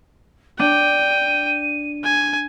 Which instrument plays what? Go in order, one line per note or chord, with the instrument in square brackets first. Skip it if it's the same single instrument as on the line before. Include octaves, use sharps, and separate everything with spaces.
[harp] D4 [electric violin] G5 [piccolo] D#7
[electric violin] G#5